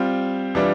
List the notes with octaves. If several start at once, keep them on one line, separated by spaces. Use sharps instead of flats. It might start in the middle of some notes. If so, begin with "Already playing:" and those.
Already playing: G3 C4 F4
E3 G3 D4 F4